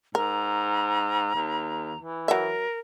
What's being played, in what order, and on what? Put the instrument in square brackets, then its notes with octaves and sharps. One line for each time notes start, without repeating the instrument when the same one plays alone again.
[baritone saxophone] G#2 [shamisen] A#4 [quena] A#5
[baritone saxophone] D#2
E3
[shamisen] F#3 E5 [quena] A#4